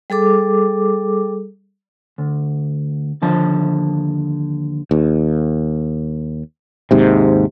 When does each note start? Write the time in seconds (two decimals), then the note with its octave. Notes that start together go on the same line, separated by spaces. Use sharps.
0.10 G3 G#4 A4 D6
2.18 D2
3.22 D#2 D3 F3 A5
4.91 D#2
6.91 D#2 G#2 C3